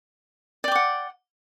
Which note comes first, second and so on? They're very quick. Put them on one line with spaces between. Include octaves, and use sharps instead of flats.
D5 G5 D6 F#5